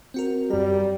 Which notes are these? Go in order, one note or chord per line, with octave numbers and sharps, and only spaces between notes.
C4 F#4 A#4
F#2 G3 A#5